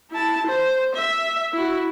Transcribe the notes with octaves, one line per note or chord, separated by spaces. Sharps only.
E4 A5
C5
E5
E4 F#4